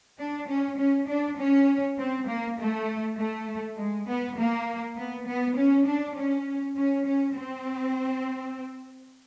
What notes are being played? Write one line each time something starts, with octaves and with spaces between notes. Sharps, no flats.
D4
C#4
C#4
D4
C#4
C4
A#3
A3
A3
G#3
B3
A#3
B3
B3
C#4
D4
C#4
C#4
C#4
C4